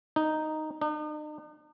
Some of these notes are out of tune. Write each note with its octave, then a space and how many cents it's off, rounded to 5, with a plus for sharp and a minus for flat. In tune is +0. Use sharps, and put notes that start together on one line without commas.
D#4 -5
D#4 -45